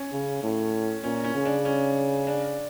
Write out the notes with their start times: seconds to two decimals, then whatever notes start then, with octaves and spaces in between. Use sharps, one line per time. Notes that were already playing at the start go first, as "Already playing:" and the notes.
Already playing: C#4
0.12 C#3
0.43 A2
1.04 A#2 C#4
1.24 C#4
1.35 C#3
1.45 D4
1.65 C#4
2.27 D4